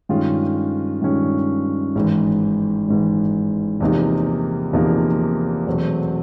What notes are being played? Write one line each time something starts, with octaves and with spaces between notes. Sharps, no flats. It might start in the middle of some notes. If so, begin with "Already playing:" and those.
G2 D#3 G#3 C#4 F4
G2 D#3 G#3 C#4 F4
G#1 G#2 E3
G#1 G#2 E3
E2 C3 F3 A#3 D#4
E2 C3 F3 A#3 D#4
E2 B2 F#3 A3 C4